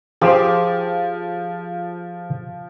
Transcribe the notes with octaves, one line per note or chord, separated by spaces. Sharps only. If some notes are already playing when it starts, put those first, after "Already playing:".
F3 G4 G#4 C5